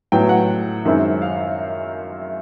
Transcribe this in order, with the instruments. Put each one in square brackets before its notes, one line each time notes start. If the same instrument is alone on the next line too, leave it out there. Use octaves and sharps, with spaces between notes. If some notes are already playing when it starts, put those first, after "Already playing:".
[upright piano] A2 F#3 B3 G5
F#5
F#2 D#3 G#3 C4 E4
F5